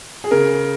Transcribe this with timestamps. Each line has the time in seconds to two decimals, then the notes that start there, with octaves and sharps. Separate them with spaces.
0.24 G#4
0.31 C#3 A#4